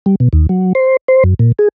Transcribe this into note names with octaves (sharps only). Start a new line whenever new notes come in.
G3
B2
D#2
F#3
C5
C5
F#2
A#2
G#4